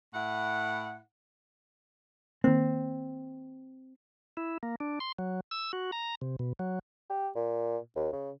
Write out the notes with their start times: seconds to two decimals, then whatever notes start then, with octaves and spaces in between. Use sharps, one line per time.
0.14 A2 E4 F#5
2.44 D#3 A#3 C4
4.37 E4
4.63 A#3
4.80 D4
5.00 C6
5.19 F#3
5.51 E6
5.73 F#4
5.92 A#5
6.21 C3
6.39 B2
6.59 F#3
7.10 G4
7.35 A#2
7.96 D#2
8.13 C#3